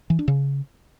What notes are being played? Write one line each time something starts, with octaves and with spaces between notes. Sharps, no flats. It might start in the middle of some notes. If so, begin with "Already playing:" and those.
E3
D4
C#3